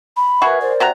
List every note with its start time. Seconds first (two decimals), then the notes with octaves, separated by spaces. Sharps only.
0.16 B5
0.42 F#4 G#4 A#4 B4 E5
0.61 A#4 C5 D5
0.80 C3 F#4 A#5